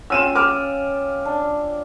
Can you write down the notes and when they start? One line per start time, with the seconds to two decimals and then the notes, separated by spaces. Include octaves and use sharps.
0.10 C#4 F4 G5 E6 D#7 E7
0.35 D6 E6 F6
1.25 D4